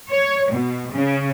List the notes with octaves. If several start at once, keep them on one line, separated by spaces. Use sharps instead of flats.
C#5
B2
C#3